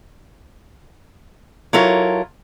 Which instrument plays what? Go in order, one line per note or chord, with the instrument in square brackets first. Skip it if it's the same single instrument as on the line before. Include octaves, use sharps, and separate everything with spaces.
[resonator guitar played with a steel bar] F#3 E4 F4 A4 A#4 C#5